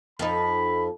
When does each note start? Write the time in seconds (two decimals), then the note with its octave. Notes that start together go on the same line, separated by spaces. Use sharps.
0.19 F2 D#4 B5